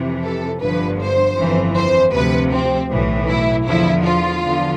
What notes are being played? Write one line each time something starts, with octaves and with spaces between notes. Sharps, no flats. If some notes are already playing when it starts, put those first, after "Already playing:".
Already playing: F2 C3 E3
A4
G1 G2 D3 F3 B4
C5
G1 F2 E3
C5
D2 C3 F3 B4
C4
B1 A2 E3
E4
E2 D3 F3 E4
F4
E2 D3 F3